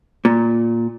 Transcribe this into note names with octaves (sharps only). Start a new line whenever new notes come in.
A#2